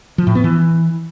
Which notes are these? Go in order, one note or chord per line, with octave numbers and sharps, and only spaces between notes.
F3
A2
B3
E3